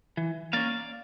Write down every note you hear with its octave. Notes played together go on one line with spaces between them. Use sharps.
E3
A#3 C#4 D5 F5